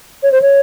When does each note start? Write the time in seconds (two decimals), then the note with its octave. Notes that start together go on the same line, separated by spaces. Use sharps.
0.23 C#5
0.32 C5
0.41 C#5